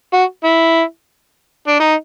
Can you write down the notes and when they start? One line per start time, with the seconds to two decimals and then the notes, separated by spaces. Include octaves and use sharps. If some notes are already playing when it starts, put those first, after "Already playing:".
0.13 F#4
0.44 E4
1.67 D4
1.80 D#4